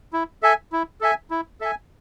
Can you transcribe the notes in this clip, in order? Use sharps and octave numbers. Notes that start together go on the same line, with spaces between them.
E4
A4 E5 G#5
E4
A4 E5 G#5
E4
A4 E5 G#5